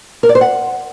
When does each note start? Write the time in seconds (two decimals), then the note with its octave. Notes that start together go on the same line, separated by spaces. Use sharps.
0.23 A#4
0.29 D5
0.35 C5
0.41 F#5